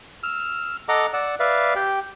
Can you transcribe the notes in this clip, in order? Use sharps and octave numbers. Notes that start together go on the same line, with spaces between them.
E6 F6
A4 D#5 F#5 A#5 D6
D5 F#5 E6
B4 D5 E5 F5
G4 G5